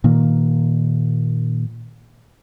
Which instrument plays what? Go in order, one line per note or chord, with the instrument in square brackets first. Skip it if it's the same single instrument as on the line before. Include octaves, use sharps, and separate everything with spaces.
[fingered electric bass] A#2 D#3 A#3